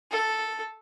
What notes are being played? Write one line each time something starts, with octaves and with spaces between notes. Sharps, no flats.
A4